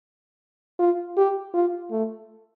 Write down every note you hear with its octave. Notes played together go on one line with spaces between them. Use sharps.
F4
G4
F4
A3